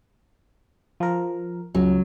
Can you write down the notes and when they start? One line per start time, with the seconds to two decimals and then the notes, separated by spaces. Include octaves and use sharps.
1.00 F3 A#4
1.75 C#2 F#3